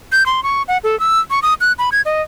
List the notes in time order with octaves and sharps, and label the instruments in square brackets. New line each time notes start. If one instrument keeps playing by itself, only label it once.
[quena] G6
C6
C#6
F#5
A4
E6
C#6
D#6
F#6
B5
G#6
D#5